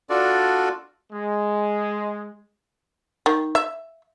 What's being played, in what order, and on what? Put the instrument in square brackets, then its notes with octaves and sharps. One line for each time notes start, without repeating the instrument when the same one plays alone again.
[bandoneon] D4 F4 F#4 A4 D5
[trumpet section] G#3
[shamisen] D#3
E5